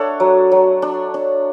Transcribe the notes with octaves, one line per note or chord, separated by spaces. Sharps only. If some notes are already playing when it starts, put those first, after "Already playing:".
Already playing: D4 A4 C#5 E5 F#5
F#3
F#3
D4
D4